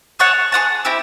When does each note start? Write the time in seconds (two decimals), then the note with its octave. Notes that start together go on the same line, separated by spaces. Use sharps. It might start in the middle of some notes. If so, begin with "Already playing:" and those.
0.19 G#4 C#5 F#5 A5
0.52 G#4 C#5 F#5 A5
0.85 C4 E4 G4